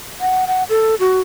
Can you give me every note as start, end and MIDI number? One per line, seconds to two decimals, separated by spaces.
0.21 0.45 78
0.47 0.63 78
0.69 0.95 69
0.99 1.21 66